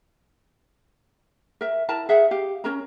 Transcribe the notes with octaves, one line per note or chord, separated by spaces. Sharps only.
A#4 E5
E4 A#4 A5 A#5
G#4 E5 F#5
G4 F5
C#4 A#4 A#5